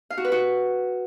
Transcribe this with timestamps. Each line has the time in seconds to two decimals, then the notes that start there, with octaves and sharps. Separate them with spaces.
0.10 F5
0.18 F#4
0.25 B4
0.32 F#4